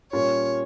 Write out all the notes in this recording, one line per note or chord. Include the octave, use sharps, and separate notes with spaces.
A#2 G3 C#4 F4 C#5